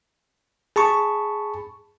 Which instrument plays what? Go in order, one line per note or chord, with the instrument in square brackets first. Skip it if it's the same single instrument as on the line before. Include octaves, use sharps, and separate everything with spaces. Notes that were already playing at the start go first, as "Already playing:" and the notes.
[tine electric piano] G#4 A5 B5 C#6